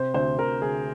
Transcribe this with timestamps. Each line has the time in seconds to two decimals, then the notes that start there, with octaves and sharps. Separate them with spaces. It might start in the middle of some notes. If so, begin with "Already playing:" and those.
Already playing: C3 C5
0.14 D2 C5
0.38 D2 A#4
0.62 D2 G#4